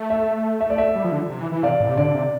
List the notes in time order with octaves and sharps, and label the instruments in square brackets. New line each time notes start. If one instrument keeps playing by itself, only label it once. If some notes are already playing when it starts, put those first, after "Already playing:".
Already playing: [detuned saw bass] A3
[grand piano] E5
E5
D5
E5
[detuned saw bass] G3
F3
D3
C3
E3
E3
[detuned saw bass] C3 [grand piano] D5 F5
[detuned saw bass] A2
C3
[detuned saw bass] D3 [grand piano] D5
[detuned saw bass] C3